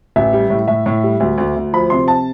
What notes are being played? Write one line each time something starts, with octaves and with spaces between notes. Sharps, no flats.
A1 E5
G3
A2
A2 E5
A2
G3
D2
D2
D2
F3 B5
C3 C6
A5